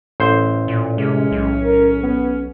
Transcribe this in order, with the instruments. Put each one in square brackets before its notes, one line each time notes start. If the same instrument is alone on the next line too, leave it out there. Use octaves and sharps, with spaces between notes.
[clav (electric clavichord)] A1 C5
[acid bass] A#2
[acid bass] C3 [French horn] G#3 [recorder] C#4
[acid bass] B1
[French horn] A#4
B3